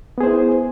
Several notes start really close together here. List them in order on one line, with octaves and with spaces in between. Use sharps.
B3 G#4 C5 E4